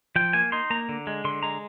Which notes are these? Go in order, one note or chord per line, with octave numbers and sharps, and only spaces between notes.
F3 G5
A#3 G#5
D#4 C6
A#3 A#5
D3
G#3
D3 C6
G#3 A#5